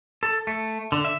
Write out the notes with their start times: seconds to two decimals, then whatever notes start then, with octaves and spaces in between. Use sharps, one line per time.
0.23 A4
0.47 A3
0.92 D3
1.05 E5